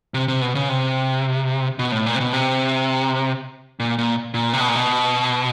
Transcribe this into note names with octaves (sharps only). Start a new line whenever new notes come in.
C3
C3
B2
C#3
C3
B2
A2
A#2
C3
B2
C3
A#2
A#2
A#2
C3
B2
A#2
B2